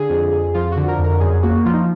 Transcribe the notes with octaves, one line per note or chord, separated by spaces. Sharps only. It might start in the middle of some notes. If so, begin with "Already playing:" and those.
Already playing: D3 G#4
F2
F2
F3 F4
D3 F#4
A#4
F2
A#4
F#2 G#4
A#3 F#4
F3 F4
D#4
F4